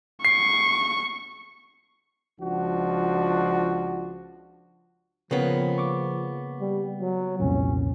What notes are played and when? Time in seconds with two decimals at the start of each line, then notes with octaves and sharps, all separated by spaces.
0.25 C#6 C7
2.41 C#2 F3 D4 F#4
5.31 C#3 F3 A#3 B3 G5
5.78 C#6 D6
6.61 G3
7.00 F#3
7.40 C2 F2 A#2 C#4